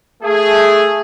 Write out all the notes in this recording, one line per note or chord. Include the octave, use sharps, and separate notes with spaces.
A3 G#4